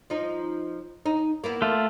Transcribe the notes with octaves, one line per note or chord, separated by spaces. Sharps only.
F3 D#4
D#4
A#3 B3 E4
A3 F4